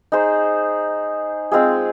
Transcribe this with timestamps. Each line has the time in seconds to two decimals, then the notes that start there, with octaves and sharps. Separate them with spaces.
0.12 D#4 G#4 C5
1.52 G#3 C4 F4 G#4